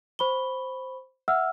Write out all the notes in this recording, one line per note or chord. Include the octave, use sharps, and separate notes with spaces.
C5 B5 C#6 G7
E5 F#5 E6 F6